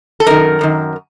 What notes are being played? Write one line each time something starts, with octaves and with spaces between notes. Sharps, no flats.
A4
F#2 D#3 A#4
F#2 D#3